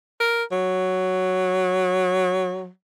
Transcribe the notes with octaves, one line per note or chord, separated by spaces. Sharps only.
A#4
F#3